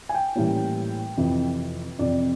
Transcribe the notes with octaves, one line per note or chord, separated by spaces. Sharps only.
G#5
G5
A2 E3 G3 A#3 C#4
F2 C3 E3
F2 C3 E3 D5